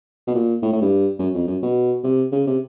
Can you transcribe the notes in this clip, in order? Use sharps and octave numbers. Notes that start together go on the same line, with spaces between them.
B2
A#2
A2
A2
G2
F#2
F2
F#2
B2
C3
C#3
C3